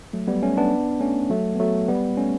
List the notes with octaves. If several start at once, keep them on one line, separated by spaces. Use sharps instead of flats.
F#3 A3
G3 B3
A3 C#4
B3 D4
A3 C#4
F#3 A3
B3
F#3 A3
G3 B3
A3 C#4